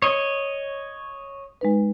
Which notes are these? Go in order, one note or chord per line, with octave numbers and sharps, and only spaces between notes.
C#5 D#5
G#3 D#4 B4